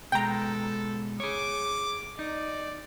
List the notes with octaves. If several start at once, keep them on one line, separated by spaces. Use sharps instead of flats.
B2 G#3 A4 G5 A#5
G#4 C#5 D6
D#4 D5